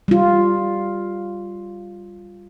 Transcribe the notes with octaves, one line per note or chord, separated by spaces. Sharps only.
G3 F4